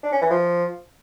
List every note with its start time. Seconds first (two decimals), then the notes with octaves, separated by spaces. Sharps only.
0.03 D4
0.12 C#4
0.21 E3
0.30 F3